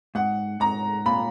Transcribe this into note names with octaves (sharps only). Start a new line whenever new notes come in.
G#2 F#5
G#2 A#5
A#2 B5